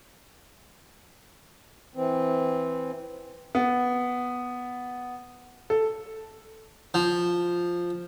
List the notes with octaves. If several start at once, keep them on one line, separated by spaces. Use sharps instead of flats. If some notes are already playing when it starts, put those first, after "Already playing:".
E3 C4
B3
A4
F3